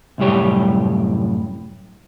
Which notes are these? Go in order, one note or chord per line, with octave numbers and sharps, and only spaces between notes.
C2 F#2 A2 G3 G4 C#5